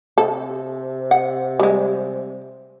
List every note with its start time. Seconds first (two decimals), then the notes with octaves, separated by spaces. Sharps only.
0.18 C3 A4
1.11 F#5
1.59 G3 G#3